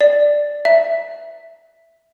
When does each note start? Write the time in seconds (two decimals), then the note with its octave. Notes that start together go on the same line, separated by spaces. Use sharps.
0.01 D5
0.65 E5